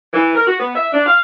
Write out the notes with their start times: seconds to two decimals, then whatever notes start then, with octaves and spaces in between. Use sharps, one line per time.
0.13 E3
0.34 A#4
0.46 F#4
0.59 B3
0.75 E5
0.92 D4
1.06 F5